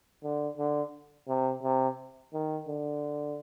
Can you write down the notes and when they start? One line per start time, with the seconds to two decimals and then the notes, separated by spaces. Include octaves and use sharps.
0.24 D3
0.58 D3
1.28 C3
1.63 C3
2.33 D#3
2.68 D3